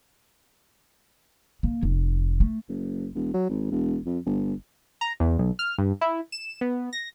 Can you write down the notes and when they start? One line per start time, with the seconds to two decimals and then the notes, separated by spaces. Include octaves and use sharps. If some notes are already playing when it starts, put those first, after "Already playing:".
1.63 A#3
1.83 F1
2.40 A3
2.69 F#1
3.15 E1
3.34 F#3
3.49 G#1
3.71 E1
4.06 F2
4.26 G1
5.01 A#5
5.20 E2
5.38 B1
5.59 F6
5.78 G2
6.01 E4
6.32 E7
6.61 B3
6.93 A#6